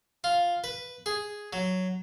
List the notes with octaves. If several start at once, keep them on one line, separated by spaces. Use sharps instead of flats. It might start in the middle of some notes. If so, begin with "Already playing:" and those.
F4
B4
G#4
F#3